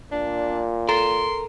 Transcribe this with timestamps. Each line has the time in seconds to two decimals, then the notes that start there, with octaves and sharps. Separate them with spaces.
0.12 A#2 D4
0.89 A4 A#4 C6